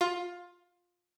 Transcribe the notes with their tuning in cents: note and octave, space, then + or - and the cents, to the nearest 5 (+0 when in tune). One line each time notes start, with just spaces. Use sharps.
F4 +15